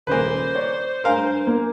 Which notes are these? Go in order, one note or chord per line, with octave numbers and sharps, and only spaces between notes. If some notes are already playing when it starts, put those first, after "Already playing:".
D#1 C#3 A#3 B4 C5 G#5
C#5 D5
G2 A#4 F5 G#5 C6
A#3